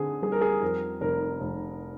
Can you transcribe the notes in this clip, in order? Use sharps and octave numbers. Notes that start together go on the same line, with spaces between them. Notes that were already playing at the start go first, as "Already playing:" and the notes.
Already playing: D3 C4 G#4
G3 G#4
A#4
G#4
F2 A#4
F1 A#4
F1